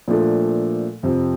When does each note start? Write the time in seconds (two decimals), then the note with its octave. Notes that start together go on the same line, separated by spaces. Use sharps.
0.08 A#2 F3 A3 D4 A4
1.03 F2 C3 F3